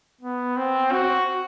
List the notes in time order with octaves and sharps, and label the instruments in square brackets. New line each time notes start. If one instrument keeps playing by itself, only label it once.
[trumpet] B3
C4
F#4